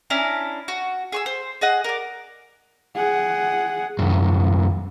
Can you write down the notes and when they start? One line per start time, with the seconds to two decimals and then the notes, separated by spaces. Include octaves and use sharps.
0.10 C#4 D4 E4 A#5
0.68 F#4
1.12 G#4 C#6 E6
1.26 C5
1.61 G#4 D#5 F#5
1.84 A#4 D5
2.96 G#4 F#5
3.99 C2 F#2